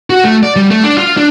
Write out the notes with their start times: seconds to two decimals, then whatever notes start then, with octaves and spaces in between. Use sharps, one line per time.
0.10 F#4
0.24 A3
0.43 D5
0.56 G3
0.71 A3
0.84 D4
0.98 F4
1.17 D4